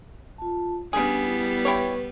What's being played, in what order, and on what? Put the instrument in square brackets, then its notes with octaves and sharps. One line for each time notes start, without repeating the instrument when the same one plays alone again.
[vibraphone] F4 A5
[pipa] C#3 G#4 [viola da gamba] G3 B3 [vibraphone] D4
[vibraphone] E4
[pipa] E4 G4 C#5 [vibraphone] B4